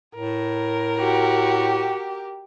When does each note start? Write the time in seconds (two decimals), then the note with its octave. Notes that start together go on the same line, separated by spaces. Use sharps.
0.15 A2 A#4
0.99 F#4 G4